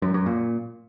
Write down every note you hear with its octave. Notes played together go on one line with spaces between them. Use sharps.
F#2
F#2
A#2